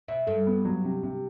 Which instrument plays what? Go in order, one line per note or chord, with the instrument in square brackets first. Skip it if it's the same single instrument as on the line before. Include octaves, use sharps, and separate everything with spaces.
[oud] B2 [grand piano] E5
[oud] G2 [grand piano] A4
[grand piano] B3
F#3
C3
C3